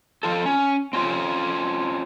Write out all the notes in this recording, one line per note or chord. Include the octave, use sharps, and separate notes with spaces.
F3 F4 A4
C#4
C4 C#4 F4